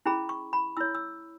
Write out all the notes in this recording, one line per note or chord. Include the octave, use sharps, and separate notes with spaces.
C#4 E4 G#4 B5
C#6
B5
E4 C#5 E6
E6